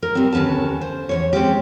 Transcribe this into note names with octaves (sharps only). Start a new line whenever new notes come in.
A#4
G3 C4
D#2 D3 C#4 B4 A5
C5
E2 G#2 C#5
G#3 C4 C#4 G4